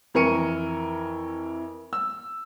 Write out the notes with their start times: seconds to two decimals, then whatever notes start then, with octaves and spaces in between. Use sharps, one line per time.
0.14 F2 E3 A#4 C#6 C#7 D#7
1.93 E6